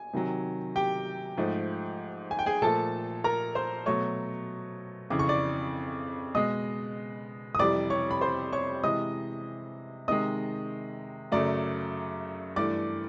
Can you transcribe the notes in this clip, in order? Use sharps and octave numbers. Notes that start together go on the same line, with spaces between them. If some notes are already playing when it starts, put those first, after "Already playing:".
Already playing: G#5
C3 D#3 F#3
G4 G5
G#2 F3 A3
G#5
G5
G#4 G#5
A#2 F3 A3 A4 A5
A#4 A#5
C5 C6
B2 F#3 A3 C#5 C#6
F2 C#3 E3 D6
C#6
D5 D6
B2 G#3 D#5 D#6
D#6
F2 C3 E3 G3 D5 D6
C#5 C#6
B5
C5 C6
C#5 C#6
C3 E3 G#3 D#5 D#6
C3 D#3 G#3 D#5 D#6
F#2 C#3 F#3 A3 D5 D6
G2 E3 A3 D5 D6